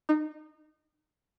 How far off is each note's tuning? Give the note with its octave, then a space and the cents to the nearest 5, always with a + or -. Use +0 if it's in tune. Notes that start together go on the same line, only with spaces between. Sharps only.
D#4 -25